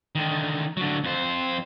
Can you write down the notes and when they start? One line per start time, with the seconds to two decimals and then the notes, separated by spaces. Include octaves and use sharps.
0.15 D3 D#3
0.77 D3 F#3
1.04 F2 C5